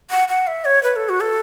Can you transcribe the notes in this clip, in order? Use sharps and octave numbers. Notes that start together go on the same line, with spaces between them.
F#5
F#5
E5
C#5
B4
A4
F#4
A4